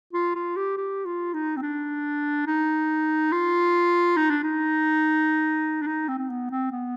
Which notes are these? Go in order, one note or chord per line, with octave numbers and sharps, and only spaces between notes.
F4
F4
G4
G4
F4
D#4
C4
D4
D#4
F4
D#4
D4
D#4
D4
D#4
C4
C4
B3
C4
B3